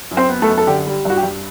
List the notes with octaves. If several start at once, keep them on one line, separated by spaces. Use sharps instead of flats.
F#2
C4 C5
B3
A3 A4
F#2
A4
D3 G4
G3
G2 F#4
G4
G2